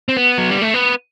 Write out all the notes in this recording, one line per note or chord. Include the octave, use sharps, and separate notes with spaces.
C4
B3
F#3
G3
A3
B3